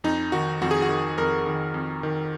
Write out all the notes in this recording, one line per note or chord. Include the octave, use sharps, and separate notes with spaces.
F2 D#4
D#3 F#4
F2 F#4
G#4
F#4
D#3
F2 A#4
D#3
F2
D#3